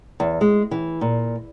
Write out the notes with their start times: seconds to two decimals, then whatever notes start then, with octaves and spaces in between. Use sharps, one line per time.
0.20 E2
0.41 G#3
0.71 E3
1.01 A#2